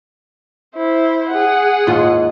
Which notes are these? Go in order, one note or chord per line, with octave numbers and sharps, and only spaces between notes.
E4 C5
G#4 F#5
D#2 G#2 F4